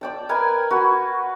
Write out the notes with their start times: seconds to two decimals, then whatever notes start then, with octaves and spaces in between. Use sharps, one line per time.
0.01 D5 G5 A5
0.29 A#4 B4 G5 G#5
0.70 F#4 B4